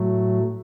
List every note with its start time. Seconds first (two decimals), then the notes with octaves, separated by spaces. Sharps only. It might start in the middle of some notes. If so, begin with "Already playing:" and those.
Already playing: A2 F#3 A3